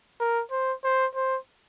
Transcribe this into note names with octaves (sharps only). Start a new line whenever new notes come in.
A#4
C5
C5
C5